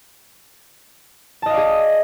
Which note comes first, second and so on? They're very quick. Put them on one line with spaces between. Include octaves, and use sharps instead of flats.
A5 D#5 F5 D5 G#4